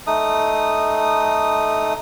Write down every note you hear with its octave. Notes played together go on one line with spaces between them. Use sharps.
A3 D#4 D#6